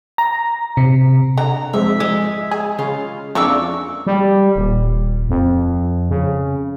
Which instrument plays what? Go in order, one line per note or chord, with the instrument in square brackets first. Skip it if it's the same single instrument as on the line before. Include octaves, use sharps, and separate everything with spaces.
[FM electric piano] A#5
C3
[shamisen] D3 [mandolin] A#5
[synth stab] F2 G#2 [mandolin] E5
[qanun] G#3
[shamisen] G#4 [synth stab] G#5
[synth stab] C#3 [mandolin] F4
[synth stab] F2 D4 [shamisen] C#3 E3 A#3 [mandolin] C#6 D6 E6
[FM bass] G3
D#1
F2
C#3